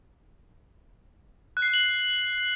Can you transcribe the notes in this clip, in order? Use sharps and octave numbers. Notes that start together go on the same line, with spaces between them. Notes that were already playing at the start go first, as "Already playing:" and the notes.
F#6
C7
F#6
F#7
C7